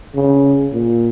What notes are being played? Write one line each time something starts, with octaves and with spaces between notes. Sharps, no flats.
C#3
A#2